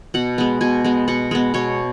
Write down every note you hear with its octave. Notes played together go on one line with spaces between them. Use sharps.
B2 F#5
G#3 B3
B2 G#5
G#3 B3
B2 F#5
G#3 B3
B2 C#5